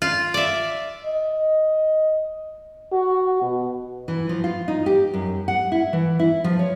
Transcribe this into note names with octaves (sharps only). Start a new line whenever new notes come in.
F4
D5 E5
D#5
F#4
B2
E3
F3
F4
D#4
G4
F#2
F#5
E4
E3
E4
F3
C#5